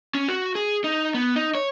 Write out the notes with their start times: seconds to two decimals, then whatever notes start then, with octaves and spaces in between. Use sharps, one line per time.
0.15 C#4
0.29 F#4
0.55 G#4
0.84 D#4
1.14 B3
1.36 D#4
1.55 C#5